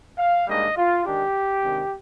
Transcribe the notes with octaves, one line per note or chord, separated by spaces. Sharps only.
F5
G#2 G3 A#3 D4 D#5
F4
D#3 G#3 D4 G4
C3 D#3 G#3 D4